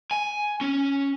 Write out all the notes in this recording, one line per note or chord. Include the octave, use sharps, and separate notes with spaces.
G#5
C#4